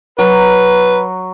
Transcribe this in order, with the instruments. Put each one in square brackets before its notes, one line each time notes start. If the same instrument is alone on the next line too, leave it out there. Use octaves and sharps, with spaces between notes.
[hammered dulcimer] F#3 [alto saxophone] B4